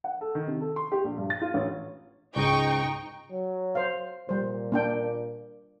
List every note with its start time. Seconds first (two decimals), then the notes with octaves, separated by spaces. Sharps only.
0.04 F#5
0.21 A4
0.35 D#3
0.47 C3
0.61 A4
0.76 C6
0.92 G4
1.04 A#1
1.18 G2
1.30 A6
1.41 F4
1.54 A1
2.36 C#2 G#2 D#4 G5 C#6
3.31 F#3
3.75 C5 F5
4.29 A#2 G3 C5
4.72 A#3 D4 G5